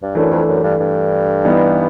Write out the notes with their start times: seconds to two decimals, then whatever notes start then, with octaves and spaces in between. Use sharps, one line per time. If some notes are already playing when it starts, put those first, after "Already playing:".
0.03 G2
0.15 F#2 E3 A3 D4
0.31 F2
0.48 F#2
0.63 G2
0.80 G2
1.45 E3 G3 B3 D#4